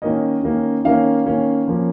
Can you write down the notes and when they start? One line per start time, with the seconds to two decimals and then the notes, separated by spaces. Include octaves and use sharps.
0.02 D#3 A#3 C#4 D#5
0.43 D#3 A#3 C#4
0.85 D#3 A#3 C#4 F5
1.26 D#3 A#3 C#4
1.68 F3 A#3 C#4